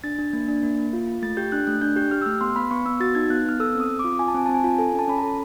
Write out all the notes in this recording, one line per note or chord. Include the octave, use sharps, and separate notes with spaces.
D4 A6
D4
A#3
D4
A#3
A#3
F4
F4
A3 A6
G4 G6
D4 F#6
A3 F#6
D4 G6
G4 G6
G4 F6
E6
A3 F6
B3 C6
B3 B5
B3 C#6
B3 E6
F#4 A6
D#4 G#6
B3 F#6
B3 F6
A4 E6
C4
D#6
C4
F4 D6
F4 G#5
A5
C4 G#5
C4 A5
G#5
F4
A4 G#5
C#4
A5
C#4 B5
A4 A#5